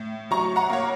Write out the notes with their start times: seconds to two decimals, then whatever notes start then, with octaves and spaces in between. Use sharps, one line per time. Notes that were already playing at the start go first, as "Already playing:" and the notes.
Already playing: A2
0.31 F#3 A#5 C#6
0.56 F#5 A#5
0.70 A#3 C#5